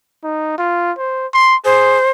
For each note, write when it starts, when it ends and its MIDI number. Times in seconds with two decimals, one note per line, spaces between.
0.24 0.56 63
0.58 0.92 65
0.98 1.26 72
1.34 1.56 84
1.65 1.99 68
1.65 2.11 72